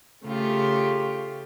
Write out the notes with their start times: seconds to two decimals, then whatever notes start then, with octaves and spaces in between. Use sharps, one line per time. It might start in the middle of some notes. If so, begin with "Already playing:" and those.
0.24 C#3 A3 F4 G4